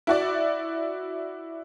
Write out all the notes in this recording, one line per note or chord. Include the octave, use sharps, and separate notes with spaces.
E4 F#4 D5